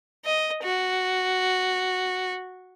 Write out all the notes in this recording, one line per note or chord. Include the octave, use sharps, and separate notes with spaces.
D#5
F#4